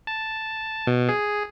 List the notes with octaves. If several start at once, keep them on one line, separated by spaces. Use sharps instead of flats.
A5
B2
G#4